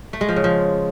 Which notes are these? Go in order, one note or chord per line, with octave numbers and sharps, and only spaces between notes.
A3
G#3
F3
C#3
F3